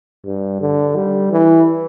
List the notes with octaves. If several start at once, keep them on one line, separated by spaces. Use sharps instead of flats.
G2
D3
G3
E3